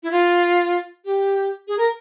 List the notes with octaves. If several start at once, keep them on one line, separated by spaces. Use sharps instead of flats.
E4
F4
G4
G#4
A#4